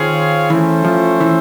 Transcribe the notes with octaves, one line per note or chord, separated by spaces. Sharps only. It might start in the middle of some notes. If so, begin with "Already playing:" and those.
Already playing: D#3 C4 F4 G#4 C#5 F5
E3 A3 C#4 E4 A4 C5
F3
E3